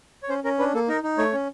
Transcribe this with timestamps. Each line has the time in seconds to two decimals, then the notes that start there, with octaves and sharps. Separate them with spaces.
0.23 C#5
0.29 C#4 C5
0.44 C#4 A#4
0.59 D4 B4
0.74 A#3 A4
0.88 D#4 A#4
1.03 D#4
1.18 A3 C#5
1.33 C#4